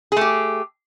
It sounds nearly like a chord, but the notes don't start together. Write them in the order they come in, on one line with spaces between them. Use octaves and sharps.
G#4 A3 G4